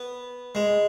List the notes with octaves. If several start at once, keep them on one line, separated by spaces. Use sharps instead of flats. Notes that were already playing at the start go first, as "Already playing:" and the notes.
Already playing: B3
G#3